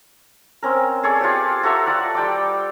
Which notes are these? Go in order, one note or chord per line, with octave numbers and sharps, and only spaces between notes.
C4 C#4 A#4
G#4 A4 C#5 D5
F4 G4
F#4 A4 E5 A#5
F4 D5 F#5
G3 G5 D6